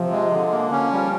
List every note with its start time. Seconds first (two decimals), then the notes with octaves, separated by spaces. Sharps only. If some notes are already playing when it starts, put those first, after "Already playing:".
Already playing: C3 F3
0.11 G#3
0.31 D3 F3
0.51 A#3
0.71 C#4
0.92 G3